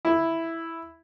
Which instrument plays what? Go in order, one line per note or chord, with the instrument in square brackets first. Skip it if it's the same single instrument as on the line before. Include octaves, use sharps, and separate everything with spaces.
[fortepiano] E4